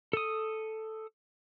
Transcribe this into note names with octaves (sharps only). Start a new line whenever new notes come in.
A4 D#6